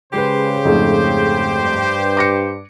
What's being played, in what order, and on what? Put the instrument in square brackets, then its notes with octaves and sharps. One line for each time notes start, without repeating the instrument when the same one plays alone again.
[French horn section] C#3 [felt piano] G#3 B4 [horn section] G4 C5
[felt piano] F2 G#2 A3
[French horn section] G2
[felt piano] D6 A#6 C#7